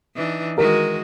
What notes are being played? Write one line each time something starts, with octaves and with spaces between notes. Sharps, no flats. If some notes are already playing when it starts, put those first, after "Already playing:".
E3 D4 D#4
D#3 G#3 F#4 A#4